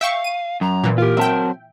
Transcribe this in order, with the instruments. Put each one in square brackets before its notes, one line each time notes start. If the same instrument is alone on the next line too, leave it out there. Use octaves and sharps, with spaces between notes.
[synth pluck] E5 G5 C#6 [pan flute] F5
[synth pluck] D#7
[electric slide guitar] F#2 [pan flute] A#5
[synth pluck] A#2 E3
[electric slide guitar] F4 G4 [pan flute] A#4
[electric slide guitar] F#3 C4 A5 [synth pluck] E5 G5